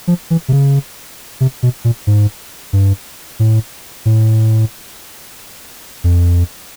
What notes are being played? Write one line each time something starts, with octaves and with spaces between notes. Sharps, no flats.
F3
E3
C3
C#3
C3
B2
A#2
G#2
G2
A2
A2
F2